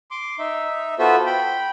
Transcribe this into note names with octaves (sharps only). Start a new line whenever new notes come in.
C6 D6
D#4 E5
B3 F4 F#4 A4 C5 E5
G5 B5